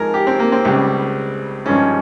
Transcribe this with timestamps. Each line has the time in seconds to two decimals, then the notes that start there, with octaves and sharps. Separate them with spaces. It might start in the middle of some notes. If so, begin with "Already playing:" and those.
Already playing: G#1 G#2 F3 G#3 G#4 A#4
0.14 G4
0.27 C4
0.39 A#3
0.52 C4
0.65 C#2 C#3 G3
1.65 G#1 G2 F3 G#3 C#4